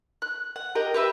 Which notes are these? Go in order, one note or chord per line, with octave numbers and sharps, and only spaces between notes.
F#6
F#5
G4 A#4 D#5
G4 B4 E5 B5